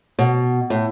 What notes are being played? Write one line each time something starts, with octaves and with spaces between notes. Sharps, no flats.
B2
A2